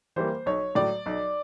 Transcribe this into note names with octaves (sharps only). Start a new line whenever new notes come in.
E3 G3 A#3 C5
B1 C#5
A2 F#3 D5
B1